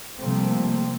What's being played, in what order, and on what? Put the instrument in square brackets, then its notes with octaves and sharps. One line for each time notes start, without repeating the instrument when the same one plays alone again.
[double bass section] C3 F3 G3 A3 A#3 C4